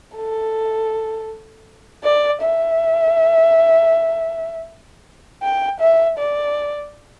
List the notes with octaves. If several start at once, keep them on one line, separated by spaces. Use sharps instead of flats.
A4
D5
E5
G5
E5
D5